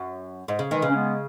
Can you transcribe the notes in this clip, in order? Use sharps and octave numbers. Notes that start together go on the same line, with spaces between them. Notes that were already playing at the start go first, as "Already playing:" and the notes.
Already playing: F#2
G#2
C#3
D#3 E3 G#3
C#3
C#4
G#3 B3